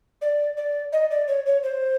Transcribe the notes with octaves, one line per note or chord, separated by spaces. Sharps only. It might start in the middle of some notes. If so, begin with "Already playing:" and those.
D5
D5
D#5
D5
C#5
C#5
C5